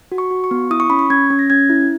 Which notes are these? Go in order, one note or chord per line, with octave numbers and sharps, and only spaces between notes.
F#4
C#6
F#4
C#6
B3
E4 D#6
C#6
C#4 B5
C#6
C#4 G#6
C#4
A#6
C#4 G#6
E4